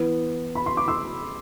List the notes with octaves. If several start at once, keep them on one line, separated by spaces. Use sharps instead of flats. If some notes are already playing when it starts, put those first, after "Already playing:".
Already playing: E3 B3
B5
C6
D6
C6 E6